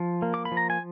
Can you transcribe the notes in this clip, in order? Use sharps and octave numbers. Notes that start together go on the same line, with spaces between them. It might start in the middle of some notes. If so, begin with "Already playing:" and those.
Already playing: F3
A#3
D6
B5
F3
A#5
G#5